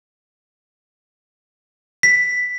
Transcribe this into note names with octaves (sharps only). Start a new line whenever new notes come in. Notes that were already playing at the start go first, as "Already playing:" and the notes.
B6